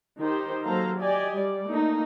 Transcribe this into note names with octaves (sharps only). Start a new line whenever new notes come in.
D#3 D#4 G4 C5
F#3 A#3 A4 C5 F5 A#5
G4 D5 D#5 G#5
G3 D5
A3 A#3 D#4